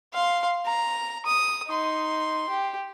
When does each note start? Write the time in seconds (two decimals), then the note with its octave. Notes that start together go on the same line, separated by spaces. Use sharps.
0.14 F5 C6
0.65 A#5
1.26 D#6
1.67 D#4 C6
2.49 G4